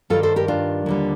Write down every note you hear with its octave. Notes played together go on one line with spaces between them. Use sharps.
G2 D#3 G3 F4 A4
A4 C5
G4 A#4
D4 F4
D#2 D3 G3